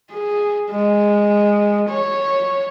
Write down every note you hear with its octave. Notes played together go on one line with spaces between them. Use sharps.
G#4
G#3
C#5